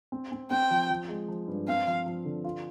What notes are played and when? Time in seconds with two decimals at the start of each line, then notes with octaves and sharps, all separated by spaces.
0.12 C4
0.32 C4
0.51 C4 G5
0.71 F3
0.90 F3
1.09 G#3
1.28 F3
1.48 G2
1.68 C4 F5
1.87 F3
2.06 F3
2.25 D3
2.44 F4